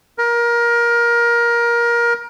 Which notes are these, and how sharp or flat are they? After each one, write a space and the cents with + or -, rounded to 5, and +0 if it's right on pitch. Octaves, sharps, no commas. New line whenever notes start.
A#4 +20